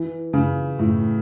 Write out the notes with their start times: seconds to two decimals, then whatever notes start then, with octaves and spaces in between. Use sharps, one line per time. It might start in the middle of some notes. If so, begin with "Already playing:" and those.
Already playing: E3
0.33 C#3
0.79 A2